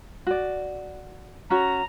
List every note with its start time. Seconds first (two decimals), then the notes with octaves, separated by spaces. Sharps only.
0.27 F#4 D5
1.50 C#4 F#4 A#5